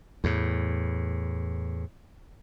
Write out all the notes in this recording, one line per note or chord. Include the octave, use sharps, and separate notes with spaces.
E2 A2